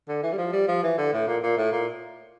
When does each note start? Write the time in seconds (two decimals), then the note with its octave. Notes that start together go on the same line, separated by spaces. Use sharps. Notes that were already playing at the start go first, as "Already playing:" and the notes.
0.08 D3
0.23 E3
0.33 G3
0.38 F3
0.53 G3
0.68 F3
0.83 E3
0.98 D3
1.13 A2
1.27 A#2
1.43 A#2
1.57 A2
1.72 A#2